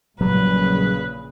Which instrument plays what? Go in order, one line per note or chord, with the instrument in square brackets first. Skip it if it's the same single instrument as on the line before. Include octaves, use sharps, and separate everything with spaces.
[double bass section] A#1 A#2 C#3 [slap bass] F#3 G3 [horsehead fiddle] B4